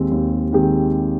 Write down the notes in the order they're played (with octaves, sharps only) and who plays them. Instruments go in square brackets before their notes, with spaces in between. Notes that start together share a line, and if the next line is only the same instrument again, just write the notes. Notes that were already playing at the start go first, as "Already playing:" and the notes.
Already playing: [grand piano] D#2 D#3 G#3 C4 G4
D#2
D#3 G#3 C4 G4